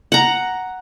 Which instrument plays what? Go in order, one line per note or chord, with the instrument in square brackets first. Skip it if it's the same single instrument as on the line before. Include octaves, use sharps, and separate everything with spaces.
[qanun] F#5 A#5